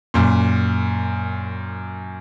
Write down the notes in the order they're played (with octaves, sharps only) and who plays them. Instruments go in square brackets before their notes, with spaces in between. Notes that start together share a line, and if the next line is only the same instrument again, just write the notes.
[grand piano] F#2 A#2